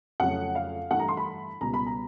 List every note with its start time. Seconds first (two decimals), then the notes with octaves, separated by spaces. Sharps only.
0.20 F2 C#3 F#3 A3 F#5
0.55 F5
0.91 G2 E3 A3 F#5
0.99 A#5
1.09 C6
1.17 B5
1.61 C#2 B2 G3 A#5
1.74 B5
1.86 A#5